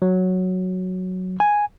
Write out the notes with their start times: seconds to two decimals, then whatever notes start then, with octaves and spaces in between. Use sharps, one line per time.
0.02 F#3
1.40 G#5